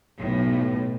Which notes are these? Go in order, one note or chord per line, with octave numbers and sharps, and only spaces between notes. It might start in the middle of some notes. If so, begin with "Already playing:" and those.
B1 A2